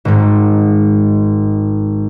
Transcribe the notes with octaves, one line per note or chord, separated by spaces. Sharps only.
G#1 G#2